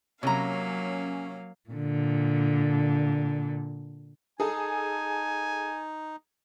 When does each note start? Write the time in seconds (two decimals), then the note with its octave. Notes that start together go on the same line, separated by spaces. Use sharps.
0.23 C3 F#3 A#3 C#4 F5 A#5
1.70 A#2 D3
4.40 D#4 G#4 A4 G#5